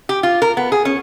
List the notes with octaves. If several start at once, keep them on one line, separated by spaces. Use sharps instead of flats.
G4
F4
A#4
B3
G#4
C#4